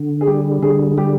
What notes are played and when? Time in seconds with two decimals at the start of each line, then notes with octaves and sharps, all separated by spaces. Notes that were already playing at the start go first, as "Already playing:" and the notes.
Already playing: D3
0.21 G#4
0.27 G3 G4
0.62 D3 G#4
0.98 G3 G4